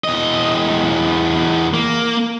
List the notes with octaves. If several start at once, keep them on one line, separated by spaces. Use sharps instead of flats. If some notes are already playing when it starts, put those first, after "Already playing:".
E2 D#5
A#3